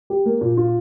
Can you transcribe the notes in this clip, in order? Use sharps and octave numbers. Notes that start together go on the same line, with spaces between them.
G4
A#3
A#2
F4